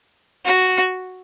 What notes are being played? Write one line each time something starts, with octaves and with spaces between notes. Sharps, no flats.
F#4